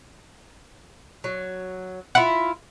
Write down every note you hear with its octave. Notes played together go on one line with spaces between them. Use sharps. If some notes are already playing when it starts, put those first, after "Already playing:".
F#3
E4 F4 F#5